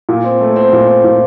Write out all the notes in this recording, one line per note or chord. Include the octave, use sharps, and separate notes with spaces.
A#2
C4
A3
C4
A#2
C4
A#2